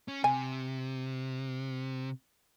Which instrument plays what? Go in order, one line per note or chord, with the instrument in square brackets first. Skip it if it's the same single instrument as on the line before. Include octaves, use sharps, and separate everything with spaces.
[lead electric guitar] C#4
[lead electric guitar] C3 [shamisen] G#5